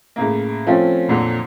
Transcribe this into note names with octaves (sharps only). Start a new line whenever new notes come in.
A2 C#3 A#3
F3 A3 C4 C#4 F4
F2 A#2 D3 F#3